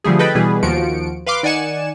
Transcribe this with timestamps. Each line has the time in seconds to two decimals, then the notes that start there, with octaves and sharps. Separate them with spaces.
0.04 D3 F3 G3 A3 G#4
0.19 A4 B4 D#5 G5 B5
0.35 B2 E3 G3 G#4 B4
0.63 D#2 F3 F#4 C#7 D7
1.26 B4 F5 C6 D6
1.43 D#3 D5 F#5 G#5 C#7 E7